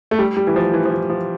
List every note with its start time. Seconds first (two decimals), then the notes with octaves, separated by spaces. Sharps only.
0.11 A3
0.19 G3
0.37 G3
0.47 E3
0.56 F3
0.73 E3
0.85 F3
0.92 E3
1.10 F3